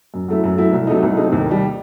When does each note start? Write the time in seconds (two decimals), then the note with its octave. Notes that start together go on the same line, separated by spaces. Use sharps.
0.14 F#2
0.28 F#3 A3 E4
0.44 F#2
0.58 F#3 A3 E4
0.72 C2
0.87 C3 F#3 A3 D#4
1.03 C2
1.17 C3 F#3 A3 D#4
1.33 D#2
1.46 D#3 G3